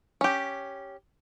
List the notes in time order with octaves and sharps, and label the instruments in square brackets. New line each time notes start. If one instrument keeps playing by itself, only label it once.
[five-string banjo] C#4 G4